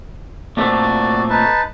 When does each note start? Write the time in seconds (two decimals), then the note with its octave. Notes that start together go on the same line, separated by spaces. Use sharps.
0.57 A#2 A3 C4 F#4 D5
1.30 D#4 B4 A5